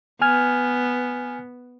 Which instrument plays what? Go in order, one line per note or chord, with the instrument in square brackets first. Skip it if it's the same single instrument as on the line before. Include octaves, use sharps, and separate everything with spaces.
[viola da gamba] B3 [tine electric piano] G#5 F6 G#6